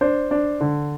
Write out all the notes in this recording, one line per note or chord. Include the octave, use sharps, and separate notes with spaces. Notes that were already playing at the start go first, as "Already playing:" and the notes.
D4 C5
D4
D3